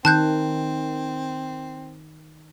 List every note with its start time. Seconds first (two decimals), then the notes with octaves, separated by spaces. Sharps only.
0.05 D#3 C4 A5 F#6 G6